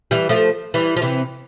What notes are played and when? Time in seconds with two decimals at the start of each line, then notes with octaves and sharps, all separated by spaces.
0.11 E3 G3
0.29 F3 A3
0.74 E3 G3
0.97 F3
1.02 C3 E3